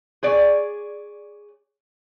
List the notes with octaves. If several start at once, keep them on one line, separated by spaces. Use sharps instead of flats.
G#4 C#5 D5